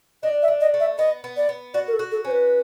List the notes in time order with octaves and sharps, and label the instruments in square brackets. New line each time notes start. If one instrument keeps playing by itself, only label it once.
[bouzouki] D4 [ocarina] D#5
[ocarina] E5
[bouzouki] D4
[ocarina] D#5
[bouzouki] A3
[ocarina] E5
[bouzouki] B3 [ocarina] D#5
[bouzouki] B3
[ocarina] D5
[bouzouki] B3
[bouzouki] F#4 [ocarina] D5
[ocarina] A#4
A4
[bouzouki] F#4
[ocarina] A4
[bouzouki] C#4 [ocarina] C5
[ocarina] B4